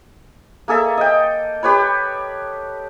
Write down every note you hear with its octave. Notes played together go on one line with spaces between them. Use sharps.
A#3 G#4 A4 E5
D#5 G5
G4 B4 C#5 B5